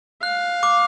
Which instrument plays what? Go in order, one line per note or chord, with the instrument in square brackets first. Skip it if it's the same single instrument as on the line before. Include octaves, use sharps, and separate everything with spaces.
[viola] F5 [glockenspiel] F#6
[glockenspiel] D6